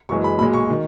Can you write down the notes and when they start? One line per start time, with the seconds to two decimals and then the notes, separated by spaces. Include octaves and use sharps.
0.09 F#1 F#2 E3 G#3 C#6
0.24 B5
0.39 B1 A#2 G#3 B5
0.53 C#6
0.70 D#3